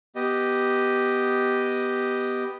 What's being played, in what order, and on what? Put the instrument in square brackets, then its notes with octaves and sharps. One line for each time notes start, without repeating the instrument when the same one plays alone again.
[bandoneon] B3 G4 D#5